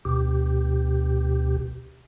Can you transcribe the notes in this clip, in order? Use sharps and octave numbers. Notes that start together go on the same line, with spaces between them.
D2 B2 G4